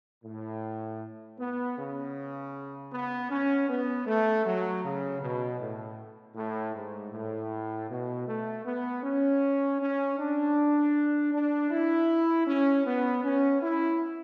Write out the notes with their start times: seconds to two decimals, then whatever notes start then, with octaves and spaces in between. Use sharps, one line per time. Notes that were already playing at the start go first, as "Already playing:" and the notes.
0.24 A2
1.39 B3
1.77 C#3
2.92 B3
3.30 C#4
3.69 B3
4.07 A3
4.45 F#3
4.84 C#3
5.21 B2
5.60 A2
6.36 A2
6.74 G#2
7.12 A2
7.89 B2
8.27 A3
8.65 B3
9.04 C#4
9.80 C#4
10.19 D4
11.33 D4
11.71 E4
12.47 C#4
12.86 B3
13.24 C#4
13.62 E4